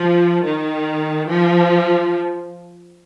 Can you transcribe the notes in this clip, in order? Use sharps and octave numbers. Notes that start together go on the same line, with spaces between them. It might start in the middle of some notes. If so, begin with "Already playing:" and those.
Already playing: F3
D#3
F3